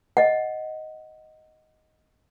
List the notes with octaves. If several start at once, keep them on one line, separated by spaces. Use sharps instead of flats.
D#5 F#5